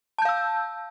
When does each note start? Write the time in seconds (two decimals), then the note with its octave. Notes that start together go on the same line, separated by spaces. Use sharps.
0.18 A5
0.22 G6
0.25 F5
0.29 E6